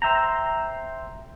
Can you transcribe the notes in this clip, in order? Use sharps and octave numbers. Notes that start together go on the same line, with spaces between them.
C5 E5 G5 A#5